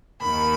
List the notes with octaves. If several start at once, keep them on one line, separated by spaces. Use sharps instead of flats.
D#2 D#3 B5